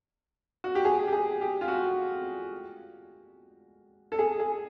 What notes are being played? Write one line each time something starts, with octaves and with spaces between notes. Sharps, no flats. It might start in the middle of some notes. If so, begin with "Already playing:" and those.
F#4
G4
G#4
G4
G#4
G4
F4
F#4
A4
G#4
G#4